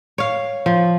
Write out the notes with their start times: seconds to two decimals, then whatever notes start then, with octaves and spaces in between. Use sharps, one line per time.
0.18 C#5 F5
0.66 F3